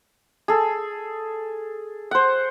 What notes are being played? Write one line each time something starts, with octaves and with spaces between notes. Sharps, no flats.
G#4 A4
C5 F#5